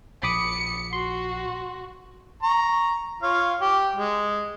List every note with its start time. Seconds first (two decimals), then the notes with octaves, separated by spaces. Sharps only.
0.23 A#1 B5 D6 D#6 C#7
0.93 F#4 C6
2.43 A#5 C#6
3.22 F4 C#5 F5
3.61 G4
3.96 G#3